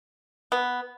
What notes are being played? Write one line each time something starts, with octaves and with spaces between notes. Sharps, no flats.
B3